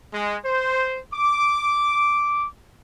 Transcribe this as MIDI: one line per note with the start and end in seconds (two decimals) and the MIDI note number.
0.12 0.35 56
0.44 0.97 72
1.12 2.46 86